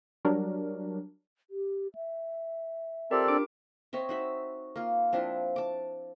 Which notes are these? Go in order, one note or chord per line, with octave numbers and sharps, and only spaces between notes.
F#3 G3 D4 A#4
G4
E5
C4 F4 G4 A4 A#4 D5
D4 D6 D7
C4 C#5 D#5 E5
D#4 F#4 E5
A#3 F4
F3 C4 D4 E4
A5 D6